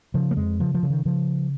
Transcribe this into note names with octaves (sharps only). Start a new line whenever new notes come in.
C#3 F3
A#3
F2 G#3
C#3 F3
F3
C#3
D#3
C#3 F3